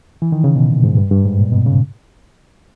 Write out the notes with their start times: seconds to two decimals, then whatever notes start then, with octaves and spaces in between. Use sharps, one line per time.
0.22 E3
0.32 D#3
0.44 C#3
0.56 B2
0.69 A#2
0.84 G#2
0.97 G2
1.11 G2
1.25 G#2
1.39 A#2
1.52 B2
1.66 C#3